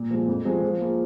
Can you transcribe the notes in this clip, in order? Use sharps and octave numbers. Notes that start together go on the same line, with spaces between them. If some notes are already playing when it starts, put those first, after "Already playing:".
Already playing: A#2
F3 G#3
F2
F3 G#3 C4
F3
A#3 F4 G#4